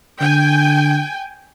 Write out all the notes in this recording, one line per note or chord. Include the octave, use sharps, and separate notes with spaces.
D3 G5 G#5